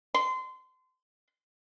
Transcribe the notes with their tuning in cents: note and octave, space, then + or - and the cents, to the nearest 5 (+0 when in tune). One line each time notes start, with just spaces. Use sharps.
C6 -25